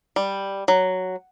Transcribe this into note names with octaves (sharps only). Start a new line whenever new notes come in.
G3
F#3